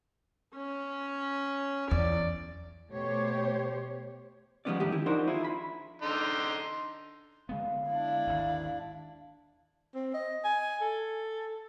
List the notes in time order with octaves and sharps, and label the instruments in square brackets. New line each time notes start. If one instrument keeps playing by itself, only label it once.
[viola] C#4
[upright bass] E2 [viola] D5
[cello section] B2 A3 G4 C5 C#5
[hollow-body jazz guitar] F3 G3 G#3 B3 C#4 D5
D#2 G#2 D3 E4 G4
D#3 E4
F3 D4 D#4 F#4 A#4 C5
E4 F4 G#4
B5
[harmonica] D3 D#4 C6
[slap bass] D3 G#3 B3 [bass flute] F5
[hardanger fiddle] D4 E4
[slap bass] G#1 D#2
[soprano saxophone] C4
D#5
G#5
A4